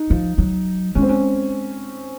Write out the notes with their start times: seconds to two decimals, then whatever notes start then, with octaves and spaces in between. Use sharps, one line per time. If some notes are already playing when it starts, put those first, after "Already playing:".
Already playing: D#4
0.10 F3
0.38 F#3
0.95 G#3 C#4
1.02 C4
1.09 C#4